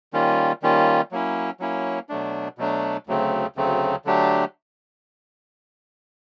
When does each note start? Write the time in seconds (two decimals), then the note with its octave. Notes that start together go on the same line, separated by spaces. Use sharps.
0.13 D#3 G3 A#3 C#4 F4
0.62 D#3 G3 A#3 C#4 F4
1.11 F#3 A#3 C#4 E4
1.60 F#3 A#3 C#4 E4
2.09 B2 F#3 A3 D4
2.58 B2 F#3 A3 D4
3.07 D2 C#3 F#3 A3 C4
3.56 D2 C#3 F#3 A3 C4
4.05 D3 F#3 A3 D4 G4